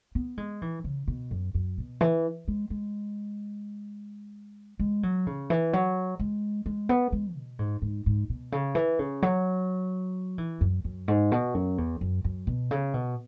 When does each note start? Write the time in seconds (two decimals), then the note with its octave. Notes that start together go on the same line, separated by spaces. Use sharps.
0.15 B3
0.37 G#3
0.62 E3
0.84 C#3
1.08 B2
1.31 F#2
1.54 F#2
1.78 B2
2.01 E3
2.48 G#3
2.70 G#3
4.79 G#3
5.03 F#3
5.27 C#3
5.50 E3
5.73 F#3
6.19 G#3
6.66 G#3
6.89 B3
7.12 G#3
7.36 B2
7.59 G#2
7.82 G#2
8.06 G#2
8.29 B2
8.52 C#3
8.75 E3
8.99 C#3
9.22 F#3
10.38 E3
10.61 F#2
10.84 F#2
11.08 G#2
11.32 B2
11.54 F#2
11.78 E2
12.01 F#2
12.24 F#2
12.47 B2
12.71 C#3
12.94 B2